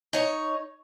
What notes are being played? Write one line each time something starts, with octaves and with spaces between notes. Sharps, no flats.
D#4 C#5